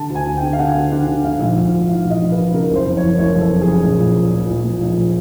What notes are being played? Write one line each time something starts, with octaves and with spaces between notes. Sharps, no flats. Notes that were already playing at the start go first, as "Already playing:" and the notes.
Already playing: D3 A5
D2
G#5
D2
G5
D3
F5
D3 F#5
D3
D3
D3
G#2 F5
A#1
A#1
G#2
E3 F5
A#1
D#5
A#1
B4
G#2
C#3 A#4
F#1
C5
F2
E3 C#5
F#1 C#5
F#1
A4
F2
G#4
C#3
A#1
A#2
A#2
A#1
A#1
A#2
A#1
A#2